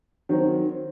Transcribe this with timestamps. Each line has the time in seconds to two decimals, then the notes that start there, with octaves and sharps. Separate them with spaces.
0.29 D#3 F#3 C4